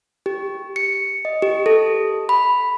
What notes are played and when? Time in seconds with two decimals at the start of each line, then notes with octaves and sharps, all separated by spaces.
0.26 G4
0.76 C#7
1.25 D#5
1.42 G4
1.66 A4
2.29 B5